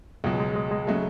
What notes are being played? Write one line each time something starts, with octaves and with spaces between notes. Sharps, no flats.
C#2 B2 F#3 G#3
G#3
G#3
G#3
C#3 F#3 G#3 A3